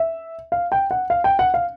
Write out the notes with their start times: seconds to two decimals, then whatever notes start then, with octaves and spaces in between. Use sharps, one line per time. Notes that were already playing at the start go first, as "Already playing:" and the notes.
Already playing: E5
0.52 F5
0.72 G5
0.91 F#5
1.10 F5
1.24 G5
1.39 F#5
1.54 F5